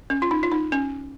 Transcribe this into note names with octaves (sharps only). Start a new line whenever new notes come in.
C#4
F4
D#4
F4
D#4
C#4